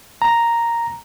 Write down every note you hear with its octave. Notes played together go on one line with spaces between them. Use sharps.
A#5